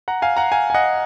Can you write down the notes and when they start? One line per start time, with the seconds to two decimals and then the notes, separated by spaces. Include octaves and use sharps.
0.08 F#5 A#5
0.22 F5 G#5
0.37 F#5 A#5
0.52 F5 G#5
0.70 G#5
0.74 D#5 F#5